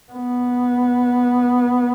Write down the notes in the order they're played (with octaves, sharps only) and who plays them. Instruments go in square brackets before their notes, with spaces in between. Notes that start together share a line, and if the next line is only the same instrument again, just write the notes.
[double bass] B3